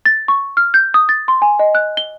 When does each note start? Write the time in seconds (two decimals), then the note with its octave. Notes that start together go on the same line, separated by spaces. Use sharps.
0.06 A6
0.28 C#6
0.57 F6
0.74 G6
0.94 D#6
1.09 A6
1.28 C6
1.42 G#5
1.59 D#5
1.75 F#6
1.97 G7